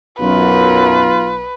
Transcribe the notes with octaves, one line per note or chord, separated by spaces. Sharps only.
B1 F#2 F4 B4